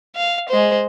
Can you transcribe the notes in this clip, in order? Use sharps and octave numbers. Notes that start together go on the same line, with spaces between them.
F5
G#3 C5